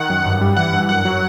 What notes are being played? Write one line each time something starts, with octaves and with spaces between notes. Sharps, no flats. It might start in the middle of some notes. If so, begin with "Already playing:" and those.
Already playing: D#3 F#5
F#2
G2
G3
E3 F#5
G2
F#2 F#5
F#3